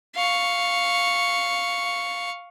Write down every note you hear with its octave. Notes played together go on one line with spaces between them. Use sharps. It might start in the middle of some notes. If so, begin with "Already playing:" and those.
F5 C#6